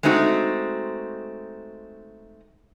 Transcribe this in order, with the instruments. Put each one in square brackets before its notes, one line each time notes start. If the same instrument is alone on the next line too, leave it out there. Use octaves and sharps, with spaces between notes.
[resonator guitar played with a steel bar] G#3 A3 C4 D#4 F#4